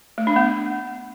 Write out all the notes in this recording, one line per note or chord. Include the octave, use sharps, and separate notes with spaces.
A3
D4
B3